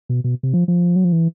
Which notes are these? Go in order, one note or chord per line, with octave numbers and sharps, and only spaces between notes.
B2
B2
C3
F3
F3
F#3
F3
E3